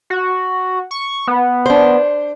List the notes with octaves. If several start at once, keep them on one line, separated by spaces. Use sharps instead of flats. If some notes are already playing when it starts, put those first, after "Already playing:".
F#4
C#6
B3
D4 C5